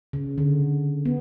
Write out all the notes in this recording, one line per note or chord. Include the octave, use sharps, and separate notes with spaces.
C#3
D3
B3